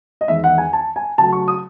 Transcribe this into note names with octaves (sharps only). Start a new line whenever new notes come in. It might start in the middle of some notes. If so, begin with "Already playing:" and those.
D#5
E2 D#3 G#3 B3 E5
F#5
G#5
A5
G#5
C#3 F#3 A3 A5
C#6
D#6